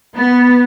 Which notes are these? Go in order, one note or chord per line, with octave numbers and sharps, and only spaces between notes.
B3